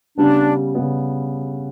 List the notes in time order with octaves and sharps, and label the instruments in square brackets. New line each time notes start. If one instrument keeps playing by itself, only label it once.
[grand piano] C#3 G3 B3 [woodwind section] D4
[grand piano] C#3 G3 B3